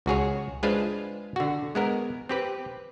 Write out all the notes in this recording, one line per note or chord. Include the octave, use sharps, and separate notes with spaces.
C#2 F#4 G#4 C#5
G#3 D4 F4 B4 C5 F5
D3 F#4
G#3 B3 A#4
C4 G4 B4